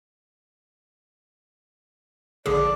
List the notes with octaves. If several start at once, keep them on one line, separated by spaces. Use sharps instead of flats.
A#1 D3 D4 G#4 D5